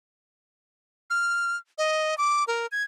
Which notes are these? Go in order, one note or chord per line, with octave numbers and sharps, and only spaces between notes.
F6
D#5
D6
A#4
G#6